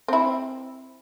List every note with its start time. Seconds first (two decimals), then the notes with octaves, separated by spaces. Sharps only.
0.08 C4 E4